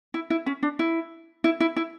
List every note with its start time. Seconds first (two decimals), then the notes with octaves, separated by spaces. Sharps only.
0.14 E4
0.30 E4
0.46 C#4
0.63 D4
0.79 E4
1.44 E4
1.60 E4
1.76 E4